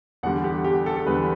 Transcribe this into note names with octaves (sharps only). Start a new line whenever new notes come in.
E2 D3 G3 F#5
G4
G4
A4
A4
E2 D3 G3 B4